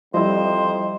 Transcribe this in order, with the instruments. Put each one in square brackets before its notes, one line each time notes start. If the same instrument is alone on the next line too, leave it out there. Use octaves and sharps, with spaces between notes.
[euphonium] F2 [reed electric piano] F3 E4 [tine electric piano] G3 D#5 [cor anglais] C5